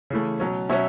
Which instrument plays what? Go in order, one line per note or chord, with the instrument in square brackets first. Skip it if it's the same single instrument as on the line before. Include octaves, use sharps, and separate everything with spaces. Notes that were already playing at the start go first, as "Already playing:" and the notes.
[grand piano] C#3 E3 A3
B2 F#3 C#4
[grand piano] B2 F#3 C#4 [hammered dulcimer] C#5 E5